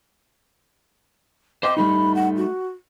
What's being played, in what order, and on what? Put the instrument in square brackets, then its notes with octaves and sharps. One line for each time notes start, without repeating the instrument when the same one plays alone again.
[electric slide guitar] C5 D#5 G5 [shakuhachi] D6
[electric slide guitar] G3 A3 D#4 [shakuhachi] B5
[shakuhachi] F#5
F#4